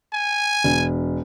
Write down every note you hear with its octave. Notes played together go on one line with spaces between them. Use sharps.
G#5
E1